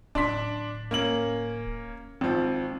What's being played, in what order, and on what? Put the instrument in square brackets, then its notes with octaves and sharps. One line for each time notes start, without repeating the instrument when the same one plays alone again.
[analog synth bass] D1 [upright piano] D4 C6 B6
[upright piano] A#3 C#4 F#7
[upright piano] G#1 F3 [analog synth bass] C4